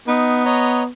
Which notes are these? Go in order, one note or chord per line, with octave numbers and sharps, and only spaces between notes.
B3 D#4
C#5 D#5 A#5